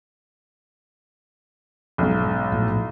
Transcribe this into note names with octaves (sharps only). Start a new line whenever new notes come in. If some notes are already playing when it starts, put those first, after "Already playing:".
B1 G#2
A#1 A2